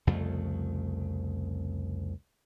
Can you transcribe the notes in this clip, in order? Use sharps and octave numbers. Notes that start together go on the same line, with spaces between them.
C2 F2 C#3 A3